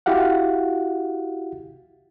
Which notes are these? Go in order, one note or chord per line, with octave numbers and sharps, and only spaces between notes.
E4 F#4 G4 F5 F#5